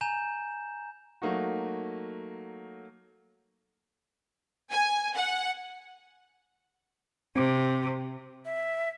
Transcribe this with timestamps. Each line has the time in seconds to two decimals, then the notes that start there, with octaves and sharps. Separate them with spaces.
0.01 G#5 A#5 G6 E7
1.22 F#3 A3 A#3 D#4 F#4
4.71 G#5
5.15 F#5
7.36 C3 C4
8.45 E5